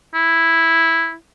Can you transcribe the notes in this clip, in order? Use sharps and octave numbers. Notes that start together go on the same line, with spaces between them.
E4